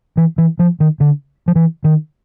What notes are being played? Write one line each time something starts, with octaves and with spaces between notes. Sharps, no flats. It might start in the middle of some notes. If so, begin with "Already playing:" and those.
E3
E3
F3
D#3
D3
F3
E3
D#3